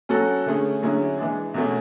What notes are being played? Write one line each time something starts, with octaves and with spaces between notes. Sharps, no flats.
F#3 C#4 F#4 A4
D3 A3 C#4 G#4
D3 F#3 C#4 E4 G#4
E3 G#3 D4
E2 B2 A3 C#4